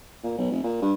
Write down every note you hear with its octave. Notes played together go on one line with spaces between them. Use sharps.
A#2
B1
F1
A#2
G2